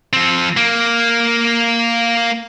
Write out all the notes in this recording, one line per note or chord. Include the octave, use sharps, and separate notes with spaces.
F3 C4
A#3